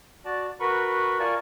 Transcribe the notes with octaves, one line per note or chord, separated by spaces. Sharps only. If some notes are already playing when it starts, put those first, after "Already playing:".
F#4 D5 A5
F#4 A#4 B4 B5 C#6
F4 A#4 D5 G#5 A5 C#6